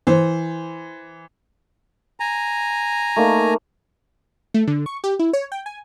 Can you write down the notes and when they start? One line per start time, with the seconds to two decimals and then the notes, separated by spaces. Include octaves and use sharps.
0.07 E3 C5
2.20 G#5 A#5
3.16 A3 A#3 D#4
4.54 A3
4.68 D3
4.86 C#6
5.04 G4
5.19 E4
5.33 C#5
5.52 G5
5.66 G#5